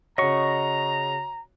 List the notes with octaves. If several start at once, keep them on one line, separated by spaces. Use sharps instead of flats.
C#3 F#4 C#5 D#5 A#5 C#6